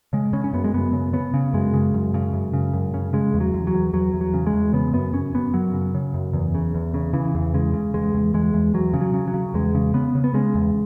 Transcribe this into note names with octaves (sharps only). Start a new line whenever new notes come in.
C#3 G#3
C#3 C#4
C#4
F#2 B3
G#3
F#2 B3
C#3
C#3 B3
C#3
F#2 G#3
C#3
F#2
C#3
F#2
C#3
F#2
C#3
C#3 G#3
E2
F#3
E2
F#3
E2
E2 F#3
E2
F#3
C#3
G#3
E2
C#3 B3
F#2 B3
F#2 C#4
F#2 B3
F#2 F#3
C#3
C#3
F#2
E2
C#3
E2
C#3
C#3 E3
E2
C#3 G#3
C#3
E2 G#3
E2
E2 G#3
E2
E2 F#3
C#3
F#3
C#3
F#3
C#3
E2 G#3
C#3
C#3 B3
C#3
B3
C#3 G#3
E2